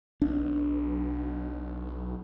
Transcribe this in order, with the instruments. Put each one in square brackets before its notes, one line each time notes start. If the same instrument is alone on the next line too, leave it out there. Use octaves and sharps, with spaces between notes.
[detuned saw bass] B1 [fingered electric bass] D4